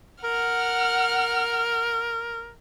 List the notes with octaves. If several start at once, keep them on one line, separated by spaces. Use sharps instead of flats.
A#4 F#5 F6